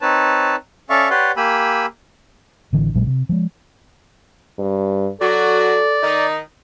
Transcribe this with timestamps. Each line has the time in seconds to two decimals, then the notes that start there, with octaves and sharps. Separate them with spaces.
0.01 C4 D#4 B4 C#5 A5
0.90 C#4 A4 D5 E5 F5 C#6
1.10 G4 B4 C#5 D5 F#5 C6
1.37 A#3 G4 G#5 B5 E6
2.73 A1 D3 E3
2.94 A#1 A#2 F#3 G#3
3.07 C3
3.29 F3 G#3
4.59 G2
5.21 F#3 F#4 A4 D5
6.03 D#3 D#4